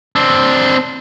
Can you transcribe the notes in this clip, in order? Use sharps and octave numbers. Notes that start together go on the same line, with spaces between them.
C4 D4